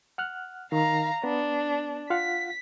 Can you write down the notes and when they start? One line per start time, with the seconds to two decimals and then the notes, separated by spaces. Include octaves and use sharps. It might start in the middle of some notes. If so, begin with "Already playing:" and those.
0.18 F#5 F6 F#6
0.72 D#3 F5 A#5
1.24 B3 D4
2.10 F4 F5 F#5 B6